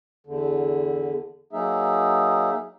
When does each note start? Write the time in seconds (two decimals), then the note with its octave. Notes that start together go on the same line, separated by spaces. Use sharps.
0.27 E2 D3
1.53 F#3 A#3 D#4 G#4 E5